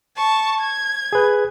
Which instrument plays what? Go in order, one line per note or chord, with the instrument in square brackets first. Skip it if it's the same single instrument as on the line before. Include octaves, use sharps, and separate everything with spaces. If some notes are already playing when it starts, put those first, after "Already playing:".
[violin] A5 C#6
G#6
[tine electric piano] G#4 B4